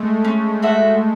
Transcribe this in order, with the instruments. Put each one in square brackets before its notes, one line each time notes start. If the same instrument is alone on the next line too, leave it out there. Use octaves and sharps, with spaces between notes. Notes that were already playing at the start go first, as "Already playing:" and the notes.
Already playing: [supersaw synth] G#3 A3
[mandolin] C#4
F#4 A4 E5